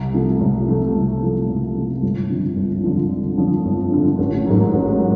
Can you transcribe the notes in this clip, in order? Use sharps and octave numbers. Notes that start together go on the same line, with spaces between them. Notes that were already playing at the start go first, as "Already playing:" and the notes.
Already playing: C2
C3 F3 A3
C2
C3 F3 A3
C2
C3 F3 A3
C2
C3 F3 A3
G1
F2 D3 F3
G1
F2 D3 F3
G1
F2 D3 F3
G1
F2 D3 F3
A1
G#2 D#3 F#3
A1